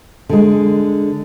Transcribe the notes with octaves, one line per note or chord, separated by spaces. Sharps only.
D3 G#3